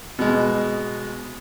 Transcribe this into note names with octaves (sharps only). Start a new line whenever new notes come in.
B2 G#3